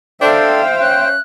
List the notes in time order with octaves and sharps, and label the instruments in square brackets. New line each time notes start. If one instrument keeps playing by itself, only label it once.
[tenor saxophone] D4 [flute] A4 [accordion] C5 G5 [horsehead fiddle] E5 F5
[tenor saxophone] C#4 [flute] F#6